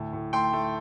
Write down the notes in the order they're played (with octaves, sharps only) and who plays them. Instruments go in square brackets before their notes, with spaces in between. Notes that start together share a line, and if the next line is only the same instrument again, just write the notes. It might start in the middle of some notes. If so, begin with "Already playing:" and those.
Already playing: [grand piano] D2 A2
A2
A3 G5 C6
A3